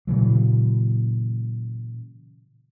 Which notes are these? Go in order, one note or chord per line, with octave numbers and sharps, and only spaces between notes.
A#2 C#3 E3 F#3